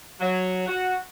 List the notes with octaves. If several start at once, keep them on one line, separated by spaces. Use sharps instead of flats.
F#3
F#4